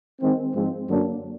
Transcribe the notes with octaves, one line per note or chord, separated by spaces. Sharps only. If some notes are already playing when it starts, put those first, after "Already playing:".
D#3 G#3 C4
G#2 F3 G#3 C4
F#2 D3 F#3 A#3 D4